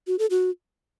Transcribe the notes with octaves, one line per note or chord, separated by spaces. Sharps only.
F#4
A4
F#4